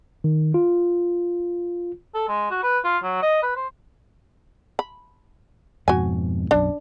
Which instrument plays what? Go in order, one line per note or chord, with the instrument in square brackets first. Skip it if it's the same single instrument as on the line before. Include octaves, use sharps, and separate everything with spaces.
[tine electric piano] D#3
F4
[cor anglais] A4
G#3
F#4
B4
F4
F#3
D#5
B4
C5
[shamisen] B5
[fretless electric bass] F2 G#2 B2 [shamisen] F#4 G#5
[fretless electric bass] B1 F#2 [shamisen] D4